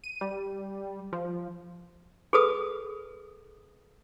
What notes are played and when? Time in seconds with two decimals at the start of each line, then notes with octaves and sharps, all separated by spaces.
0.04 D#7
0.21 G3
1.13 F3
2.33 G#4 A4 B4 D#6